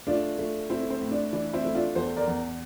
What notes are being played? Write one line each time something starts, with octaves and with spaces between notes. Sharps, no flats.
A3 D4 F4
A3
A3 C4 E4
C4
A2
D4
E3 D4
C4 E4
A3
D4 F4
E2 A4 C5
A#4 D5
E2